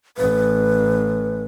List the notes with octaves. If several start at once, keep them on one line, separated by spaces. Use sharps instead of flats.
A1 B4